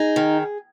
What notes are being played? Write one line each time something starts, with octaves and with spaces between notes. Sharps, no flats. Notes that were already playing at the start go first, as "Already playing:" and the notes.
Already playing: D#4 G#4
D#3